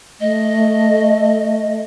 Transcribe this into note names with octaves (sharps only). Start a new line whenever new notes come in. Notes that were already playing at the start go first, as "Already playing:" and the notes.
A3 D#5